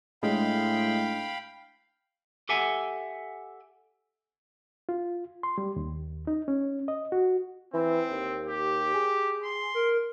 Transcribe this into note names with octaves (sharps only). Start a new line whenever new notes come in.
A2 G#3 D4 F5 G5 B5
G4 A4 E5 F#5 G#5
F4
C6
G3
D#2
D#4
C#4
D#5
F#4
E3 C4
D#2
G4
G#4
C6
A#4